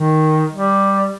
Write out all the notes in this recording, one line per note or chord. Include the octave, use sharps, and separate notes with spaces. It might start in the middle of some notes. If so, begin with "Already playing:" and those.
Already playing: D#3
G3